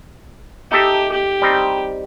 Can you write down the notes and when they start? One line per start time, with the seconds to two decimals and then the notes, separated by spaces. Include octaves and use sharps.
0.71 D#4 G4 A4 E5
1.12 G4
1.42 G3 C4 D#4